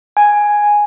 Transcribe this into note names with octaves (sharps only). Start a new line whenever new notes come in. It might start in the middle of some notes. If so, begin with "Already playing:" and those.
G#5